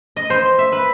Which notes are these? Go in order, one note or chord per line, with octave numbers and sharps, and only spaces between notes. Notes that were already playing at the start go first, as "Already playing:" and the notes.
D#5
C5
E5
B4